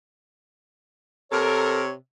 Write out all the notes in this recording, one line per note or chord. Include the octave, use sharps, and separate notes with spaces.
C3 A4 A#4 C#5